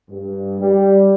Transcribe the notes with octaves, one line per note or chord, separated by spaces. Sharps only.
G2
G3